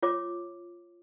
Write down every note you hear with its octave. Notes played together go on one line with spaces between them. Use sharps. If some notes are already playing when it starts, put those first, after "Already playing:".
F4 C#5 D6